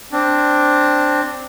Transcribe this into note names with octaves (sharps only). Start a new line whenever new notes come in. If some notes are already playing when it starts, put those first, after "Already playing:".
C4 D4